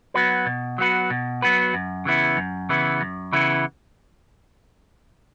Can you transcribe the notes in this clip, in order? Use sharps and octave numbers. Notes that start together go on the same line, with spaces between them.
F#3 B3 F#4 B4
B2
F#3 B3 F#4 B4
B2
F#3 B3 F#4 B4
F#2
C#3 E3 B3 E4
F#2
C#3 E3 B3 E4
F#2
C#3 E3 B3 E4